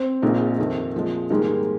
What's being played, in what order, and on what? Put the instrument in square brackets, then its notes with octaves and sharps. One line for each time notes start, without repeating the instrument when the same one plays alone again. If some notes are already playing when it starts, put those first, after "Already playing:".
Already playing: [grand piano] C4
[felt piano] A#1 A#2 G#3 D#4 A#4
F2 C3 D#3
A#2 F3 G#3
[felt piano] G#2 D#3 G3 A#3 [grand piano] G#3